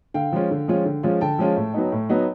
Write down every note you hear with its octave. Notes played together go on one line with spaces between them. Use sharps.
D3 F5 G5
F3 G#3 C#4 F4
D3
F3 G#3 C#4 F4
D3
F3 G#3 C#4 F4
D3 G5 A5
F3 G#3 C#4 F4
A2
F#3 B3 D#4
A2
F#3 B3 D#4